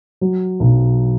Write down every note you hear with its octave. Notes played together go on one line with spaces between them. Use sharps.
F#3
B1